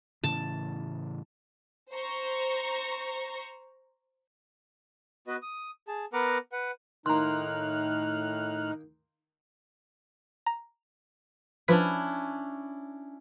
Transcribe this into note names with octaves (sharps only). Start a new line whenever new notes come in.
A2 C#3 E3 A5
C5 A#5 C#6
B3 F#4 B4 D#5
D#6
G#4 A5
B3 A#4 B4 F#5 A#5 D6
B4 F#5
A2 D#3 A#3 D#4 A#5 C6 F6 F#6
A#5
F3 C#4 D4 E4 B4 B6